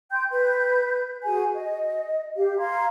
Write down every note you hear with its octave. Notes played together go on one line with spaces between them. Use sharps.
G5 C6 G6
B4 G6
F#4 G#4 G#5
D#5
G4 F5
F5 A#5 C6 G#6